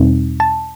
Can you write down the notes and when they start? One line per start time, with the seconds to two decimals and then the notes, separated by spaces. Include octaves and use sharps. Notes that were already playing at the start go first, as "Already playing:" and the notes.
Already playing: E2 B2 G3 C4 D#4
0.40 A5